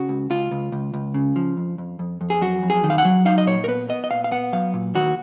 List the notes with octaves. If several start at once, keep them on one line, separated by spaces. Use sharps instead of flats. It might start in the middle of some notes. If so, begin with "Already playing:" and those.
Already playing: C#3 F#4
C#2
C#2 F4
C#2
C#2
C#2
C#3
F3
F2
F2
F2
F2
G#4
F#3 F#4
F2
G#4
D#3
F5
F#5
F#3
D#4 F5
D#5
A#2 C#5
A#4
B3 B4
B3 D#5
D#5
A#2 F5
F5
B3 F#5
F#3 F5
A#2
D#2 F#4